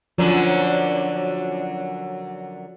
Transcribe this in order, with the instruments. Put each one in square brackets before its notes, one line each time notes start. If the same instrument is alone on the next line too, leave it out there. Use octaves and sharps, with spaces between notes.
[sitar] F#2 D3 F#3 [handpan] F3